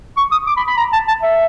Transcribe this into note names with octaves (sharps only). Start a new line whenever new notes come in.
C#6
D#6
D6
B5
B5
A#5
A5
A5
E5